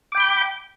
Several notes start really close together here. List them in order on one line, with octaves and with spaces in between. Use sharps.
D6 G5 B5 G6